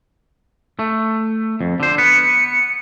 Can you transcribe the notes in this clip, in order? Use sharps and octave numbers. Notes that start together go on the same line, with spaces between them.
A3
F2
D3 C5
B3 B4 C#7